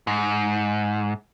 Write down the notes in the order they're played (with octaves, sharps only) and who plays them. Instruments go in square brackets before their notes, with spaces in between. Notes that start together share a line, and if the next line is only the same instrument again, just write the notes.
[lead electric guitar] G#2